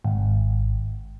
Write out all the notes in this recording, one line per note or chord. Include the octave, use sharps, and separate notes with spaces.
G#1